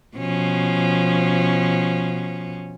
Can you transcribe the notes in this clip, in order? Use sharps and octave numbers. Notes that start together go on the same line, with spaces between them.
B2 F3 C#4